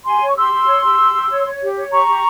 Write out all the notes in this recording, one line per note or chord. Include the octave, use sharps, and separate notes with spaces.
G4 G#5 C6
C#5
C#6
G4 C6 E6
G4
C#5
G4
G4
G4
C#5
C#5
G4
C#5
G4 A#5 C#6
G4